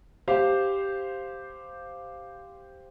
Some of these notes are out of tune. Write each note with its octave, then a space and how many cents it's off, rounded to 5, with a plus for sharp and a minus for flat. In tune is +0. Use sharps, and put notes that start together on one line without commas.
G4 +0 C5 -5 F5 +0